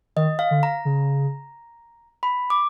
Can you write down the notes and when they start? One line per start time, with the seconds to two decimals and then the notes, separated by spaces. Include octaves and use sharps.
0.16 D#3 D#5
0.39 F5
0.51 D3
0.63 A#5
0.85 C#3
2.23 B5
2.50 D6